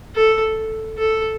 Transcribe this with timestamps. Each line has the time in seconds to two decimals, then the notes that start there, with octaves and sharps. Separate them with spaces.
0.15 A4
0.98 A4